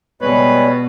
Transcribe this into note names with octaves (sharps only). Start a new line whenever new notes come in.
B2 G3 G#3 B4 C#5